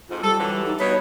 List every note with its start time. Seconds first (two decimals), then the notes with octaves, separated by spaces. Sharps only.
0.09 F2 G#2 F4
0.23 G3 A4
0.38 D3 E3 F#3
0.66 D#4
0.79 B2 D#4 B4 C#5